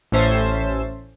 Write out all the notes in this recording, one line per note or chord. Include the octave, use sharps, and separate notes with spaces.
A1 A2 C#4 C5 E5 A5